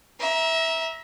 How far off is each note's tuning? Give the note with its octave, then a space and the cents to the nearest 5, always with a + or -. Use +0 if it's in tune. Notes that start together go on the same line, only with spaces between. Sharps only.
E5 -15 A#5 +25